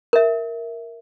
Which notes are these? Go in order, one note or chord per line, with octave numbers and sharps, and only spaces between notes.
A#4 E5